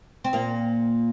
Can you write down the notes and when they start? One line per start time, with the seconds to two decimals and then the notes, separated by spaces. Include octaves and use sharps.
0.24 C4
0.33 A#2 A#3